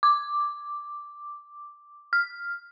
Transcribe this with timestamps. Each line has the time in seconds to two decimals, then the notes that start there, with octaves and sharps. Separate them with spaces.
0.03 D6
2.13 F6